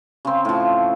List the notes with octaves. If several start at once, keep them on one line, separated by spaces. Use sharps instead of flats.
C#3 C4
A2 F3